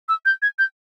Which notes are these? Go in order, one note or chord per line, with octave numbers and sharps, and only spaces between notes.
E6
G6
G#6
G6